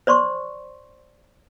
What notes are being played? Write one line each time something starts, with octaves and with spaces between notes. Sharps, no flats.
C5 D5 C6 C#6